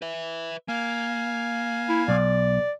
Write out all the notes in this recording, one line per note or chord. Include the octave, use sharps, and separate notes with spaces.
B4 E5
A#3 F5 G#5
E4
B1 D5